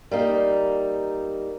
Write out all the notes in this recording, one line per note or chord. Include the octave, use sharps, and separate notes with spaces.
G3 A#3 D#4